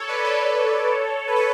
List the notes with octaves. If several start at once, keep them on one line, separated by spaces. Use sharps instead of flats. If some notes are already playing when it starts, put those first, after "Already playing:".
Already playing: A4 C#5
B4 D5
A4 C#5
B4
A4 C#5